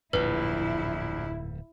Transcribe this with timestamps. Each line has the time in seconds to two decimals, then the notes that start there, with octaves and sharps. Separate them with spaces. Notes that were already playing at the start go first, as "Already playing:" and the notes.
0.13 D1 A#1 F2 G#2 E4 B4